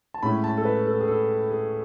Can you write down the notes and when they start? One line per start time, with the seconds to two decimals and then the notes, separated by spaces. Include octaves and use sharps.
0.14 A5
0.23 A2 G#3 C#4 E4 B5
0.44 A5
0.57 A4
0.65 B4
0.87 A4
1.00 G#4
1.08 A4
1.50 G#4